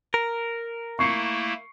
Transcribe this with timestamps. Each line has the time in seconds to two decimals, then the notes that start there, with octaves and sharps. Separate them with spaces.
0.14 A#4
0.99 A3 A#3 E4 C#6 C7 C#7